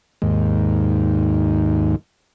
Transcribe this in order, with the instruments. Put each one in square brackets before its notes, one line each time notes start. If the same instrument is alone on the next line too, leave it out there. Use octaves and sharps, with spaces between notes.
[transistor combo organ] D#2 G#2